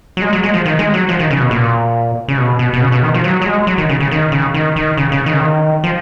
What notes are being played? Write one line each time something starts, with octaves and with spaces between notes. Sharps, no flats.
F#3
G#3
F#3
G#3
F3
D#3
G#3
F#3
F3
D#3
C#3
B2
A#2
C#3
B2
B2
B2
C#3
B2
D#3
F3
F#3
F#3
G#3
F#3
D#3
C#3
C#3
D#3
C#3
D#3
D#3
C#3
C#3
D#3
C#3
D#3
F3